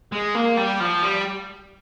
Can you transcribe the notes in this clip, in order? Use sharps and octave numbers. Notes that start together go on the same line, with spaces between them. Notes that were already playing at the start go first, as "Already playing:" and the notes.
G#3
A#3
G3
F3
G3